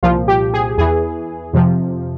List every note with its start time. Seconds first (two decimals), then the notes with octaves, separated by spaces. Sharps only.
0.03 C2 A#2 F3 F4
0.28 G4
0.54 G#4
0.78 E2 E3 G#4
1.53 F2 C3 F3